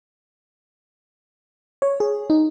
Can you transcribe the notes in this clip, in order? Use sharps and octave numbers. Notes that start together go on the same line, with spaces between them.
C#5
G#4
D#4